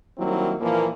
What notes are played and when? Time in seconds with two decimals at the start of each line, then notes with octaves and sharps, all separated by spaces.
0.18 D#3 F#3 G3 A#3 C4 E4
0.61 A#2 E3 F3 A#3